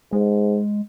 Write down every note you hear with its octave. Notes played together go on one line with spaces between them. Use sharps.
G#2 G#3